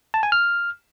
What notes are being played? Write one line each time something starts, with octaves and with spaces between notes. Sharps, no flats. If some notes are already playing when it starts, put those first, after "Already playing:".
A5
G#5
F6